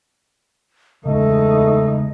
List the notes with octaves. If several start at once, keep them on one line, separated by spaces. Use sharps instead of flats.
E2 C#3 G#3 A3 D#4 D#5